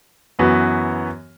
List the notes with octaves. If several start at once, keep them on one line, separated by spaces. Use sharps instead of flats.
F#2 E3 B3 F#4